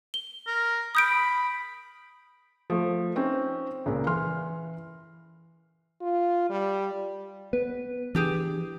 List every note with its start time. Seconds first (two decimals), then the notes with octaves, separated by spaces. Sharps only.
0.14 G7
0.47 A#4
0.95 B5 D#6 G6 D7
2.70 F3 A3
3.16 C4 C#4 D#4
3.86 C#2 A#2 C#3 A#4
4.07 E3 C6 F6
6.01 F4
6.50 G3
7.53 B3 B4
8.15 E3 D4 G4 G#4